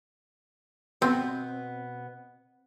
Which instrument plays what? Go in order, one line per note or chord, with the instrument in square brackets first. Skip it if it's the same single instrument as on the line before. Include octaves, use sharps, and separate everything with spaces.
[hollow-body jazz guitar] B2 B3 B4 [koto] C4